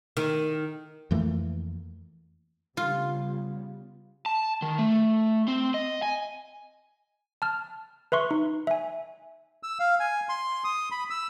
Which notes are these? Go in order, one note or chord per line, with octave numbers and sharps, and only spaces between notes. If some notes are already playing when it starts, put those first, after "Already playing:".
D#3
F2 E3 A3 A#3
C#3 G3 B3 F4
A5
D#3
A3
C4
D#5
G#5
A5 F6
B4 E5 C6 C#6
D#4
E5 G#5
E6
F5
G#5
C6
D#6
B5
E6